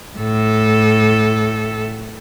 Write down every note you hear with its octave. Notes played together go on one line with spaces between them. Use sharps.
A2 A4